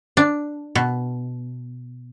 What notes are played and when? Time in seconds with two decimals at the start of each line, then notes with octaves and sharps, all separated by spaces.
0.17 D4
0.75 B2